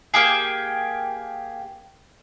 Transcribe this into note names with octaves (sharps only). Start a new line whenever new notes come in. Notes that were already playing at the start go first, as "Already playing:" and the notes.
A#3 G4 G#4